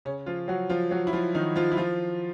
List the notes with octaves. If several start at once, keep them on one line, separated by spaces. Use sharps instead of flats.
C#3 C#4
F3 F4
F#3 F#4
F3 F4
F#3 F#4
E4
F3 F4
D#3 D#4
F3 F4
E4
F3 F4